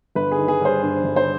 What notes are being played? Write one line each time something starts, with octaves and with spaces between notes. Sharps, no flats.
G1 B4
G#4
D#3
G#4
G3 C5
G2
G1
C5